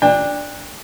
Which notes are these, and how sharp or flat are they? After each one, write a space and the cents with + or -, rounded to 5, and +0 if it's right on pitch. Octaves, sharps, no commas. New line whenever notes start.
D4 +0 G5 +35